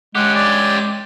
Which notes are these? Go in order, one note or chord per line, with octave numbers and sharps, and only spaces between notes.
G#3 C#4 G4 F#5
D5